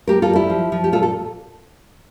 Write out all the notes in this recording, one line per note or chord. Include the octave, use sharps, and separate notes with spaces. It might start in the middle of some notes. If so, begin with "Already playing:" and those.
A#3 G4 A#4
F4 A4
G3
E4 G4
F3
F3
G4
A#2 F4 A4
A4